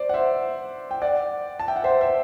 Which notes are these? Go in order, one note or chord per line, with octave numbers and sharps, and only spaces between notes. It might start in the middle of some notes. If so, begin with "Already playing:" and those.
Already playing: C5 D5
F#5
C5 E5
G5
D5 F#5
A5
E5 G5
F#5
C5 E5
C5 E5